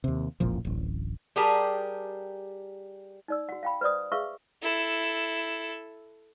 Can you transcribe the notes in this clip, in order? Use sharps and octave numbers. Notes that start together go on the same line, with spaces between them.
D#2 C3
E1 A1 A#2 F3
D1 A1
G3 G4 G#4 A#4 A5 A#5
D#4 D5 E6
F#4 F#5
F5 G5 B5
B4 C5 D5 D#6
G#4 B4 E5 F5 C#6 E6
E4 A4